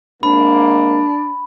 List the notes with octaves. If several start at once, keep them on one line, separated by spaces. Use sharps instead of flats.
G#1 A#3 D4 B5